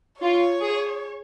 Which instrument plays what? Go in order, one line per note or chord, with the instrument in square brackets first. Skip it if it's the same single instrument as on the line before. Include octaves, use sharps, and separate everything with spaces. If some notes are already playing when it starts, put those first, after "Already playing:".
[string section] F4 [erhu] C#5
[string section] G#4